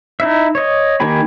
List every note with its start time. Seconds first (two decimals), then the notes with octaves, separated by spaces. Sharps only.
0.20 D#4 E4 E5
0.55 C#5 D#5
1.00 D#3 A#3 G4 G#5 B5